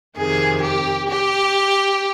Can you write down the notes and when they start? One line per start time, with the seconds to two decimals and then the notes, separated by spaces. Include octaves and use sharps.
0.17 F2 C3 D#3 G#4
0.62 G4
1.09 G4